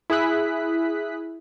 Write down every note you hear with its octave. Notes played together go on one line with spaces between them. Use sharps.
E4 G#4 D#6 F#6 B6